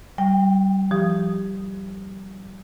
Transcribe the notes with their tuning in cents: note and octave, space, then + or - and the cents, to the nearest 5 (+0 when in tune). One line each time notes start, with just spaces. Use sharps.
G3 -30 G5 +20
F3 -30 G4 +0 D#6 -5